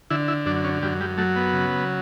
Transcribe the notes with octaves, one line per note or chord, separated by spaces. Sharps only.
D3 E4
E4
F#2 D4
C#4
F#2 G3
G3
F#3 A3
B3
C#3